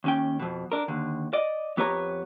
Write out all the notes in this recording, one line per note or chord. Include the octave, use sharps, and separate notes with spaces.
D#2 C#4 G5
F2 B2
D4 A#4
D#2 D3
D5 D#5
F2 B3 G4 B4 C#5 A#5